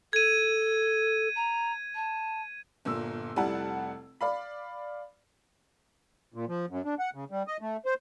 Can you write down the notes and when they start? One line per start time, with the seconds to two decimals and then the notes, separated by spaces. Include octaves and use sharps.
0.13 A4 G#6 D#7
1.36 A#5
1.95 A5
2.85 G1 A#2 E6
3.36 F1 G3 E4 F#5 A5
4.21 D5 F5 B5
6.34 A#2
6.48 F3
6.70 F#2
6.85 D4
6.99 F#5
7.14 C#3
7.31 G3
7.47 D#5
7.61 A3
7.85 C5